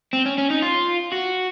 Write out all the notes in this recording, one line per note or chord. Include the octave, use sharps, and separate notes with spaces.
C4
C#4
C#4
D#4
F4
F#4